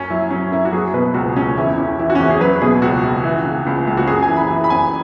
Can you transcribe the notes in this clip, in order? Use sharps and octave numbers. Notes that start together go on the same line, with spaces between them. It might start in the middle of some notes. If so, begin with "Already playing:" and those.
Already playing: F#2 C#4
F#3 E4
F#3 C#4
F#2 E4
F#4
F#3 G#4
B2 B4
C#2 F#4
C#2 C#4
E2 E4
E3 C#4
E3 E4
F#4
C#4
E2 E4
G#4
F#3 B4
B2 G#4
C#2 F#4
C#2
E3
C#3
C#2
C#2
F#4
F#2 G#4
G#5
E3
B5
E3
B5
F#2 G#5